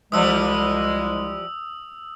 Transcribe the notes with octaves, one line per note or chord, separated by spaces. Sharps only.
C2 E3 F3 G3 G#3 D#6 E6